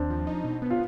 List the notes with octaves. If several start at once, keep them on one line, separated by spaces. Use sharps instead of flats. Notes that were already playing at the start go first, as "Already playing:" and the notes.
Already playing: D#2 C4 D4
F3
D#4
B2
B3
F4